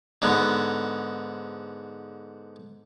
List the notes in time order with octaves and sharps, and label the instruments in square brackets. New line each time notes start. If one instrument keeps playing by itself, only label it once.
[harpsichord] G#2 D3 B3